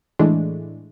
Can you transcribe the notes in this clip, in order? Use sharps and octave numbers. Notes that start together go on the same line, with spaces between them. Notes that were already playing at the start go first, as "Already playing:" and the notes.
A2 E3 G#3 A3 D4